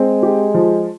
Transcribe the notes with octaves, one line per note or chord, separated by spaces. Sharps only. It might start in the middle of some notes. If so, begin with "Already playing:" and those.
Already playing: G#3 C4
G4
F3